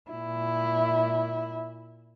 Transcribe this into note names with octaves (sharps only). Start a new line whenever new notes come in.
A#2 E4